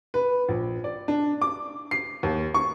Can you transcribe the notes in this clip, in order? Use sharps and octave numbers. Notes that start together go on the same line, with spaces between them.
B4
A#1
D5
D4
D6
C7
D#2
C#6